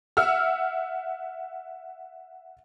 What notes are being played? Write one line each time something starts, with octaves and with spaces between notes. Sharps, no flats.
E5 F#5 E6 F6